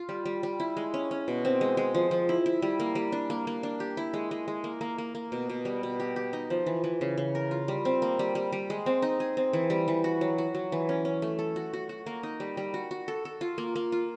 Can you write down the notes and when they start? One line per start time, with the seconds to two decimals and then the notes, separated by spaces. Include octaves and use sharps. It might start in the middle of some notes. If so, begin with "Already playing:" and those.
Already playing: F4
0.09 G3
0.25 G3
0.43 G3
0.60 E4
0.77 G#3
0.94 C#4
1.11 C#4
1.28 B2
1.45 C4
1.61 G#3
1.77 G#3
1.95 F3
2.11 F3
2.29 E4
2.46 E4
2.62 G3
2.80 A#3
2.95 G3
3.12 D4
3.30 A#3
3.47 A#3
3.63 D4
3.80 G4
3.97 E4
4.13 G#3
4.31 G#3
4.48 G#3
4.64 A#3
4.81 A#3
4.98 A#3
5.15 A#3
5.32 B2
5.49 B2
5.65 G3
5.83 B2
6.00 G4
6.16 G4
6.33 D#4
6.50 F3
6.66 E3
6.84 E3
7.01 C#3
7.17 C#3
7.35 A#4
7.51 F4
7.68 G3
7.85 C4
8.02 A#3
8.19 G3
8.35 G3
8.52 G3
8.70 G#3
8.86 C4
9.02 D#4
9.20 G#4
9.37 C4
9.53 E3
9.70 G3
9.88 E3
10.04 F#4
10.21 F#3
10.38 F#4
10.55 F#3
10.72 E3
10.89 C#4
11.05 C#4
11.22 A3
11.39 A4
11.56 F#4
11.73 F#4
11.89 F#4
12.06 A#3
12.23 D#4
12.40 G3
12.57 G3
12.74 F#4
12.91 F#4
13.08 A4
13.25 A4
13.41 F4
13.58 A#3
13.76 A#3
13.92 F4